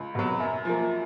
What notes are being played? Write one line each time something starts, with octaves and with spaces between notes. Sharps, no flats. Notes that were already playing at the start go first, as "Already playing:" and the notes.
Already playing: C#2
B2 F#3
F#2
F3 A#3